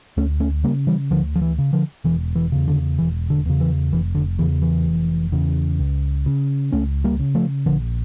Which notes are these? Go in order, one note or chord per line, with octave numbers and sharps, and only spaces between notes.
D2 A3 C#4
A3 C#4
C#3 G3 A#3
E3 G3
D2 D3 F3
F3
E3
C#3
D3 F3
E1 E3
E3
E2 C#3
D3
E1 E3
D3
E2 C#3
E3
F1 E3
D3
E2 C#3 E3
E3
F1
E2 C#3
C#2
C#3
C#2 A3 C#4
G3 A#3
C#3
F3 A3
A#1 D3 F3